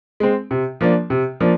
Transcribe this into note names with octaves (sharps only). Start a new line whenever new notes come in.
G#3 C4
C3
F3 A#3 D4
C3
F3 A#3 D4